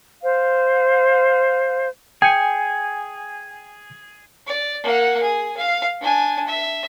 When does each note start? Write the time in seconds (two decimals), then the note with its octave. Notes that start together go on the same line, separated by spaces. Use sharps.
0.22 C5 F5
2.22 G#4 G5 G#5 G6 C#7
4.47 D5
4.83 A#3 F#5
5.22 G#4
5.57 F5
6.01 D4 G#5
6.47 E5